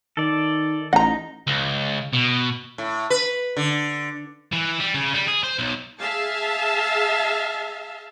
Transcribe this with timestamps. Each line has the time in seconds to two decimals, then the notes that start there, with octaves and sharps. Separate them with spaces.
0.17 D#3 A4 D5
0.93 A1 D#4 F#5 A#5
1.47 C#2
2.13 B2
2.78 A2
3.10 B4
3.57 D3
4.53 E3
4.80 G3
4.95 C#3
5.13 G3
5.28 G#4
5.44 C5
5.59 B1
5.99 G#4 E5 F5 A5